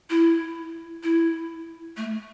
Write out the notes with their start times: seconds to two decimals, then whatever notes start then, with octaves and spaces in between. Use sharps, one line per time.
0.10 E4
1.03 E4
1.97 A3